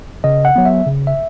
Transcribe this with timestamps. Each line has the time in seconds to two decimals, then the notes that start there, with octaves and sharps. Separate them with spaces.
0.24 C#3 D#5
0.45 F#5
0.56 F#3 B3
0.65 E5
0.86 C#3
1.07 E5